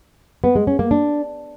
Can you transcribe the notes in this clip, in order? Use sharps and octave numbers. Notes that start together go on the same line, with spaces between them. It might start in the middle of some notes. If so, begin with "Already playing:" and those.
B3
G#3
C#4
A#3
D4